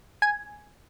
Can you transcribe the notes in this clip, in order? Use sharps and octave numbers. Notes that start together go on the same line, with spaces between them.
G#5